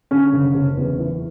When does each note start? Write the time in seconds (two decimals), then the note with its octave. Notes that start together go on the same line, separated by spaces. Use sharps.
0.11 D3 C#4
0.33 F#1
0.55 F#1
0.77 E2
0.99 E3